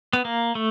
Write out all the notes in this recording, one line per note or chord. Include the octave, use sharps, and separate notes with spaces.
B3
A#3
A3